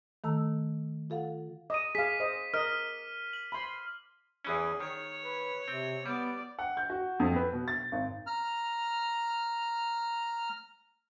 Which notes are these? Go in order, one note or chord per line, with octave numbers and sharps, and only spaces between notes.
D#3 A3 A4 A#5 E6
F4 A4 F5 F#5
D#5 D6 D#7
G#4 F5 B6
C5 D#5
A#4 D#5 F6
F#7
B5 C6
E2 E3 C#4 G#4
D#3 C#5
B4
C3 C4
G3 B3 D5
F#5
G6
F#4
F2
B4
B2
A6
G#1
A#5 F6